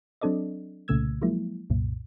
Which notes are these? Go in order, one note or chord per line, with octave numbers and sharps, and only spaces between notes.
F#3 C4 D4 A4 D5 D#5
C2 A#2 C#3 A3 E6 G#6
F3 F#3 G#3 A#3 E4
C2 F#2 A#2